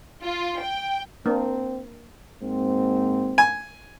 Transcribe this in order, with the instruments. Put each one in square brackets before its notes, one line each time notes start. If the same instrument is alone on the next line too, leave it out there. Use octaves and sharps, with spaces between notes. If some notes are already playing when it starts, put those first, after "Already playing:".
[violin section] F4
G5
[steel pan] A#3 D4 [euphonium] C4
[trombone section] G#2 A#3 C4
[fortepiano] G#5